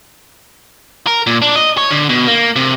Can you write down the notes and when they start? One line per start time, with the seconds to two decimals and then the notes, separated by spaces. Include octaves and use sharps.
1.07 A#4
1.27 A#2
1.42 D4
1.55 D#5
1.78 C#5
1.91 D3
2.09 B2
2.27 A#3
2.56 C3